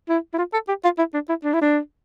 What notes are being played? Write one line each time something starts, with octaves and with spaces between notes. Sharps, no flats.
E4
E4
F4
A4
G4
F4
E4
D4
E4
D4
E4
D4